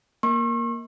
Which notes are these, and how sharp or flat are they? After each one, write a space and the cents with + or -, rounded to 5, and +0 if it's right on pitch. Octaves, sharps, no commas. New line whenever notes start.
A#3 +5 C#6 -40